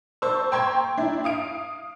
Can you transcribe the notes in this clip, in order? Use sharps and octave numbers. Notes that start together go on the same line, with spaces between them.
C5 A5 C#6 E6
G5 A#5 C6 C#6 G#6
D4 E4
F5 D#6 D7